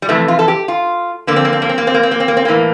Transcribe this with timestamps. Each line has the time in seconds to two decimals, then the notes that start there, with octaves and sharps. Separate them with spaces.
0.02 G3
0.09 F2 C3 E3 A3
0.28 F4
0.39 A4
0.48 G4
0.68 F4
1.27 F2 D3 A#3
1.36 C4
1.45 A#3
1.53 C4
1.62 A#3
1.69 C4
1.78 A#3
1.87 C4
1.94 A#3
2.03 C4
2.11 A#3
2.20 C4
2.28 A#3
2.37 C4
2.45 A2 E3 A#3